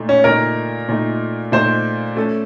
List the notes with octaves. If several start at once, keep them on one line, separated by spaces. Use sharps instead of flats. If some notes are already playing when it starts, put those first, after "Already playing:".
Already playing: A#2 A3 D#4
C#4
A#2 A3 D#4 A#4
A#2 A3 D#4
A#2 A3 D#4 C5
A3 C#4 A4